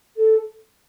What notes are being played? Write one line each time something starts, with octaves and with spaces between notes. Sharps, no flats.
A4